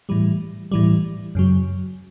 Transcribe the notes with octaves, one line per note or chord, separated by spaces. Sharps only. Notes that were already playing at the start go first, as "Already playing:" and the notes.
A2 E3 G3
A2 E3 G3
F#2 C#3 F#3